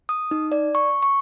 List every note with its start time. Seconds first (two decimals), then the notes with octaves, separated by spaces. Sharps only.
0.09 D#6
0.31 D#4
0.52 D5
0.75 C#6
1.03 C#6